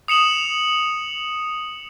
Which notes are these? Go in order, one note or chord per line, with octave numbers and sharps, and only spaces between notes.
D#6 C#7 E7 F#7